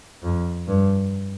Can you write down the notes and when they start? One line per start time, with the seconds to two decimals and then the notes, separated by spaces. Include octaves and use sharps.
0.23 F2
0.68 G2